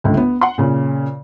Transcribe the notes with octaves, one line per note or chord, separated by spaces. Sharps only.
G1 C#2 A3
B3
F#5 C6
A#2 C#3